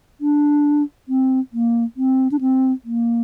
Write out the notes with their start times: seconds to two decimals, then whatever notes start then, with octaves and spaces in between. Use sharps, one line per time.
0.21 D4
1.08 C4
1.53 A#3
1.97 C4
2.31 D4
2.41 C4
2.85 A#3